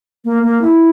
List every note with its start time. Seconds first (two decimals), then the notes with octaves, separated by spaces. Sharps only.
0.25 A#3
0.43 A#3
0.61 E4